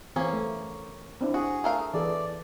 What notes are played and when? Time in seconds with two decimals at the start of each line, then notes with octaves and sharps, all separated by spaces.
0.16 E3 A#3 C4 C#4 G#4
0.33 A3
1.21 C4 D4 E4
1.34 F#4 G#4
1.64 A3 A#4 F5
1.94 E3 G#4 A4 D5